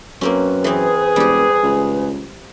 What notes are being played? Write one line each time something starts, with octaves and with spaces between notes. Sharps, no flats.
F#2 A#3 C4 C#4 B4
E3 C4 G#4
E1 G3 G4
C#2